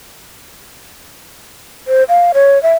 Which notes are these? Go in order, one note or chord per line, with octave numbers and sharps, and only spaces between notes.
C5
F5
C#5
E5